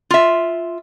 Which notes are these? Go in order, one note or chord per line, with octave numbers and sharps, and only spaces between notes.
F4 E5